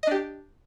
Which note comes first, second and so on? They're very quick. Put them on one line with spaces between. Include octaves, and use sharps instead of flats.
D#5 D4 G4